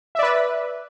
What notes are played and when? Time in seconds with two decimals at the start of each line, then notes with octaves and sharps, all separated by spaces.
0.15 E5
0.19 D5
0.23 B4